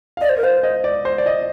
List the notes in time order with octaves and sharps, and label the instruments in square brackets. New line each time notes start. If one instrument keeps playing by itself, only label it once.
[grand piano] F5
[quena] D5 [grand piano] D#5
[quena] C5
A#4
[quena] C5 [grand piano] F5
[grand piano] D#5
D5
C5
D5
D#5